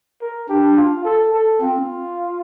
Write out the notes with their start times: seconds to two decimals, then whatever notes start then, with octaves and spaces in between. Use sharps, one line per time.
0.21 A#4
0.49 D4 G4
0.77 F4
1.05 A4
1.34 A4
1.61 C4 F4